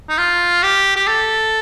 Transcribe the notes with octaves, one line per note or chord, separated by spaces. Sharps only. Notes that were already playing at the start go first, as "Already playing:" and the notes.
D#4
F4
G4
G4
A4